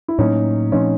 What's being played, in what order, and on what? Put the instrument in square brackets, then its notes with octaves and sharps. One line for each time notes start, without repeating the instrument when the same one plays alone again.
[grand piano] E4
[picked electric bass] A2 F#3 A#3 [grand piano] C#4 D#4
[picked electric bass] A#2 F3 A3 C4 [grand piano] C#4 D#4